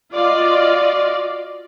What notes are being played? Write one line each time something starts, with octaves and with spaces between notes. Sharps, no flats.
F4 F#4 D5 D#5 F5